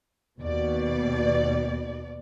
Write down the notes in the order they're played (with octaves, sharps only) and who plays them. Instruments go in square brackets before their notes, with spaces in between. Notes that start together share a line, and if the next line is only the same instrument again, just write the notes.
[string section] D#2 B2 D5